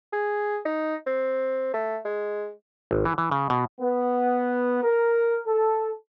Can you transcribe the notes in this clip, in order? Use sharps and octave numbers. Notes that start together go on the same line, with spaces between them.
G#4
D#4
C4
A3
G#3
G#1
E3
E3
C#3
B2
B3
A#4
A4